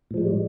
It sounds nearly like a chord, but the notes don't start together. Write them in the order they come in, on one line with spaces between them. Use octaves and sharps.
A2 F3 G#3 G3